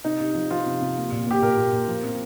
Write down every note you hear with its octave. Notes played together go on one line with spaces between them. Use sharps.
C3 D#4
C3
F3
F3 F4
C3
C3
A#3
A#2
A#3 G4
A#2 A#4
A#2
A#2
F3
C4